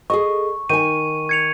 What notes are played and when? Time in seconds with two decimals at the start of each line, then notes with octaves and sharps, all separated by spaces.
0.10 G#4 A4 D#5 C#6
0.69 D#3 G#5 C#6 D#7
1.29 G#6 C#7 F7